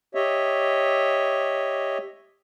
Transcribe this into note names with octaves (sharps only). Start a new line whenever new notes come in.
G4 C#5 D#5 E5